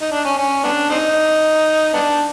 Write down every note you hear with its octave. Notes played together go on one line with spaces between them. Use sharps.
D#4
D4
C#4
C#4
B3 D4
C4 D#4
B3 D4